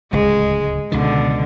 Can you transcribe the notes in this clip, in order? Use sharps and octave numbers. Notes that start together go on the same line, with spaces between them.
D1 C#2 G#3
C#2 B2 D3 D#3